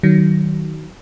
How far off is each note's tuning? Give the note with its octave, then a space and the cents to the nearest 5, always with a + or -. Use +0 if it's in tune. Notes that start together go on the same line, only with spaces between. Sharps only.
D#3 +0 F#3 +25